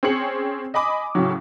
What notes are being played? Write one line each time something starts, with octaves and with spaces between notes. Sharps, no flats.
C4 C#4 G#4 C#7 F#7
D#5 G#5 B5 D6 D#6
A2 C#3 F#3